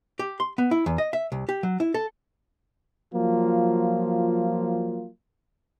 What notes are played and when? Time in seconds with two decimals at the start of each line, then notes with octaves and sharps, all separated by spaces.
0.19 G4
0.40 C6
0.58 B3
0.71 E4
0.86 E2
0.98 D#5
1.13 E5
1.32 C2
1.49 G4
1.63 F#3
1.80 E4
1.94 A4
3.14 F3 F#3 A#3 F4